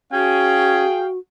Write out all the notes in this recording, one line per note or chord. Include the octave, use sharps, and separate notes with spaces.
C#4 F#4 G#4 F5 G5